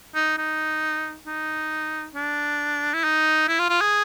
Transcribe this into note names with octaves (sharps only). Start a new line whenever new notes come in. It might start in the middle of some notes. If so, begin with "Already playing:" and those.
D#4
D#4
D#4
D4
E4
D#4
E4
F4
F4
G#4